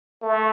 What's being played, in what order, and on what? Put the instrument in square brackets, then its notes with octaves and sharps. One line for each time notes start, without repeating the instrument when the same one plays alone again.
[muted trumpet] A3